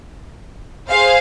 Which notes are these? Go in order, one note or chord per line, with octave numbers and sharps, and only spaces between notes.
G#4 C5 F5